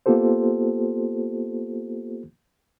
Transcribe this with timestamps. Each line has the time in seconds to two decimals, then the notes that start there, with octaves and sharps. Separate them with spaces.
0.06 A#3 B3 F4 G4 A4 C5